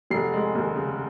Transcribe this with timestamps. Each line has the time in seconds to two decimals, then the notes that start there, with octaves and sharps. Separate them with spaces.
0.10 F1 C7
0.33 G#3
0.55 D#2
0.76 C#3